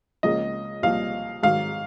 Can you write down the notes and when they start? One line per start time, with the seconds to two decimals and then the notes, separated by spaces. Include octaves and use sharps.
0.23 C#2 C#3 F3 A#3 D#5
0.83 C2 A#2 F3 F5
1.43 G#2 D#3 F#3 F5